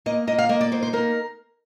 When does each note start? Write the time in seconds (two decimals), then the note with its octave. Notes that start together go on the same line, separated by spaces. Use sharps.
0.06 A#3 D#5
0.27 A#3 D#5
0.38 F5
0.49 A#3 D#5
0.61 D5
0.72 D#4 C5
0.83 C5
0.93 A#3 A#4